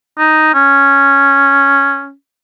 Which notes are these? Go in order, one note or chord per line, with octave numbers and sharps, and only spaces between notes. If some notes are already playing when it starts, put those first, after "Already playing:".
D#4
C#4